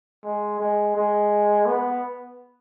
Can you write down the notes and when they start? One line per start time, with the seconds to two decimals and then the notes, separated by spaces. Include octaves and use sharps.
0.24 G#3
0.60 G#3
0.95 G#3
1.66 B3